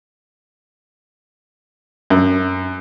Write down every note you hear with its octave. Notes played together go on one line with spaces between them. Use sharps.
F#2